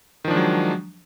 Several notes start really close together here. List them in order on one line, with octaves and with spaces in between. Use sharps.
D#3 F3 D4 G#3 F#3